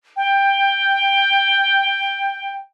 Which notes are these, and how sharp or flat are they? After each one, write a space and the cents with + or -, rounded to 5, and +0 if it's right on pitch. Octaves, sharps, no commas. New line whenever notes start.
G5 +10